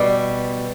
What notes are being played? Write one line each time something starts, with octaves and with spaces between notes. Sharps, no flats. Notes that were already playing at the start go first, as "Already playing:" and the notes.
Already playing: B2 G3